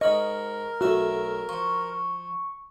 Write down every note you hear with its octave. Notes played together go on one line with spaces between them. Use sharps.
G#2 A#4 D#5 B5 C#6
B1 A3 F#4 E5
F3 C#6